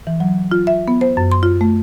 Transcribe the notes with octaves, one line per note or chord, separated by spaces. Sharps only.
E3
F#3
F4
E5
B3
C5
F#2
C6
F4
A3